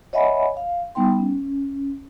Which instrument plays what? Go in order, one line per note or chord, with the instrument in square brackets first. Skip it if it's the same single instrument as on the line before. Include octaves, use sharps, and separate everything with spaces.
[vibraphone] C#5 D#5 E5 F#5 G#5 B5
F5
G3 B3 D#4 G5 C6
C#4